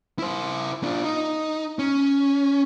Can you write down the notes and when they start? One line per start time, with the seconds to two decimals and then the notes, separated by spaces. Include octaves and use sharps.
0.19 E4 C5
0.83 D4 F4
1.05 D#4
1.79 C#4